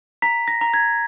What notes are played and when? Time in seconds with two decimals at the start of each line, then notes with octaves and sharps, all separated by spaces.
0.22 A#5 B6
0.48 A#6
0.61 A#5
0.74 G#6